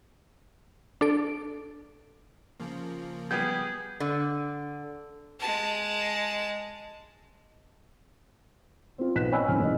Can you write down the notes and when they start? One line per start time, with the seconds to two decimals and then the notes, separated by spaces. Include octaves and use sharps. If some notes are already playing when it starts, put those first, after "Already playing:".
1.01 D4 A4 D7
2.60 C#3 F3 A#3
3.31 G3 B3 G4 G#4 G6
4.00 D3
5.40 G#3 A5
8.98 C4 F4
9.15 B1 B3 F#6 B6 E7
9.32 C#5 D#5 G#5 B5 E6 F#6
9.48 F#1 C2 C4 F6
9.59 F1 D#5